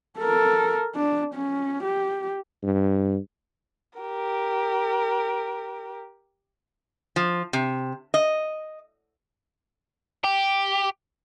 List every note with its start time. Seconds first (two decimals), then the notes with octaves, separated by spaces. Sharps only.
0.19 A4 A#4
0.96 D4
1.35 C#4
1.84 G4
2.63 G2
3.99 G4 A#4
7.16 F3
7.53 C3
8.14 D#5
10.24 G4